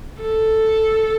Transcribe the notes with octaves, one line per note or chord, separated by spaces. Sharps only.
A4